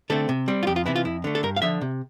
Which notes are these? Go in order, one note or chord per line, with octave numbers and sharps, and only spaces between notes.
D3 A3 C4 A4
C3
G3 C4
F4
F2 G4
F4
C3 E3 E4
F4
F2 E4
D3 A3
A4
G2 A#4
F5
D3 F3 E5
C3